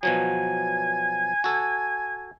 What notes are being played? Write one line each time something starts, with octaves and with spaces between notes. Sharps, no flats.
B2 F3 F#3 G#5
F#4 A4